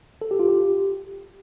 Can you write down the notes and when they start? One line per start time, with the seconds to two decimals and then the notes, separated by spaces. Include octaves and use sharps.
0.22 A4
0.31 G4
0.39 F4
0.48 G4